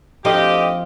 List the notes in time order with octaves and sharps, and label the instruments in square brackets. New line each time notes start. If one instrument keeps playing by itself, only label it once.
[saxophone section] D2 A3 D#5 [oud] F3 C4 D#4 [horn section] G4